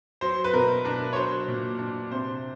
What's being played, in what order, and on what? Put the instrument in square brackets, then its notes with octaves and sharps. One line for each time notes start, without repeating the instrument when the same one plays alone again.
[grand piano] F#3 C5
B4
B2 A#4
D4 A#4
C#5
F#3 C5
A#2
D4
C3 C5